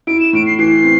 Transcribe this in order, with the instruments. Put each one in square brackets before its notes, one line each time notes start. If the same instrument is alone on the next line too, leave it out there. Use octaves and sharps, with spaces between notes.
[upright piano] E4 [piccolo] D7
[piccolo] E7
[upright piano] A2 [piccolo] D7
[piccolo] C7
[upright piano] E3 [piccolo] C7
[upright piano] C4